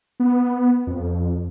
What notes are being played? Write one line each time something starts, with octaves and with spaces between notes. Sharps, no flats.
B3
F2